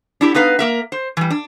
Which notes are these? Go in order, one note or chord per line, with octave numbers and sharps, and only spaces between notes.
D4 E4 G4
B3 D#4 B4 F5
A#3 A#4 E5
C5
E3 G3
D4